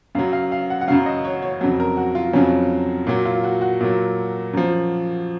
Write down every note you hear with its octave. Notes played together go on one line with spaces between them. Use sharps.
F#2 C#3 F#3 F5
F5
F5
F#5
F#5
F#2 C#3 F#3 F5
D#5
C#5
C#5
F2 C#3 F#3
A#4
F#4
F4
F2 C#3 F#3 C#4
A#2 F#3
F4
F#4
F#4
A#2 F#3
F#2 F3